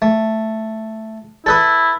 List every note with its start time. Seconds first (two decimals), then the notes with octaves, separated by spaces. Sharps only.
0.02 A3
1.46 E4 A4 B4 D#6